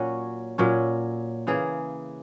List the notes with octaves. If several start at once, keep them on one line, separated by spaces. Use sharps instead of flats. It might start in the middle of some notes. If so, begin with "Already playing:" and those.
Already playing: A#2 F#3 C#4 F#4
A#2 F#3 C#4
C#3 E3 A#3 G#4